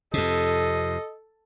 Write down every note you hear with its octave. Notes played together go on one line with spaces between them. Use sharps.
F2 C3 A4 D#5